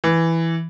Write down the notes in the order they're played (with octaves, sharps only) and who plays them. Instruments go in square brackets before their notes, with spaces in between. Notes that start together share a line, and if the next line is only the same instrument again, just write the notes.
[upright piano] E3